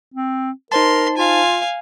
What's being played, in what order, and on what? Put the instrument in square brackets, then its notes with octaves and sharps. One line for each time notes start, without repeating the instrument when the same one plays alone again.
[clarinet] C4
[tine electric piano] D#4 C5 A5 [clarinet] A#4 [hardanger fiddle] C6
[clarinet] F4 [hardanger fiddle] F5 G#5